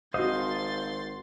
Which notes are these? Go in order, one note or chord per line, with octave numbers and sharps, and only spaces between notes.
G#1 F#4 C5 D#5 F5 C6 D#6 A6